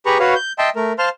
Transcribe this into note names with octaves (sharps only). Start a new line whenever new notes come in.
G4 G#4 B4 A#5 B5 C#6
F#4 B4 C#5 F5
G6
D#5 E5 G5 A5 C6
A3 A#4
C5 F5 A5 C6 F6